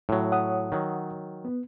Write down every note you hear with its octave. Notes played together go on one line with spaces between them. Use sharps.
A2 F#3
C#5 F#5 D#6
D#3 F#3
B3